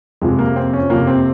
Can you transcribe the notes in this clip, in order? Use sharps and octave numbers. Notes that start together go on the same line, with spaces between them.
F2 C3 F3 G#3
A#3
C4
C#4
F2 C3 F3 A#3
C4